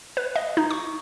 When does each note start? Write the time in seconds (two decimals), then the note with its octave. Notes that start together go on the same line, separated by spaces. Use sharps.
0.17 B4
0.36 D#5
0.57 D#4
0.71 C#6